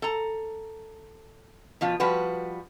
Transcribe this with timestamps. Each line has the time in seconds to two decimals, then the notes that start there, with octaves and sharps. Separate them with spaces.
0.02 A4 A#5
1.81 B2 F3 F4
2.00 F3 G3 F#4 B4